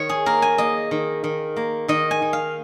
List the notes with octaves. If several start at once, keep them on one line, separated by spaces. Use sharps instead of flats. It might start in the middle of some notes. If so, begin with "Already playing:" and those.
Already playing: D#3 C#5
G#4
A#3 A#4
G#5
A#3 D#5
D#3
D#3
A#3
D#3 D#5
G#5
D#3
F5